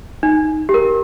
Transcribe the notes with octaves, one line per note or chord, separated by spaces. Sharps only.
D#4
G4
A#4